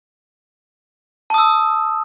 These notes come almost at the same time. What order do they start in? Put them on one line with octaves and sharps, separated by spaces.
A5 D#6 E6